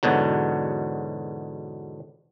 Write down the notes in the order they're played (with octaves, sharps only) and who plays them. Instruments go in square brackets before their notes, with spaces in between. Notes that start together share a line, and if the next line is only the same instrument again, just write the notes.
[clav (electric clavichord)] E2 G#2 B2 D3 F#3